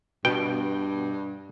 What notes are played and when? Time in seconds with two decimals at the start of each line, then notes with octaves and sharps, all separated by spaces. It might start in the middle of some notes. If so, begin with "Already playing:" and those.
0.25 G2 B2 G5